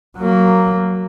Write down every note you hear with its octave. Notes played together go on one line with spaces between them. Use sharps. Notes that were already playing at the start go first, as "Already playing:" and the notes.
F#3 A#3